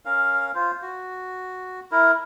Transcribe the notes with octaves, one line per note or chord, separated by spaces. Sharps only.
C#4 A#4 F5
F4 C5
F#4
E4 A#4